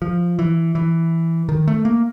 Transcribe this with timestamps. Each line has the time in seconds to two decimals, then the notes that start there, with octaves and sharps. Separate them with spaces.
0.02 F3
0.39 E3
0.75 E3
1.49 D#3
1.68 A3
1.85 A#3